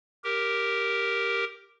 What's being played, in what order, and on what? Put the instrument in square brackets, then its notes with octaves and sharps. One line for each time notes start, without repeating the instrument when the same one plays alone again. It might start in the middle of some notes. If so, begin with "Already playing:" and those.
[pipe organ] G4 A#4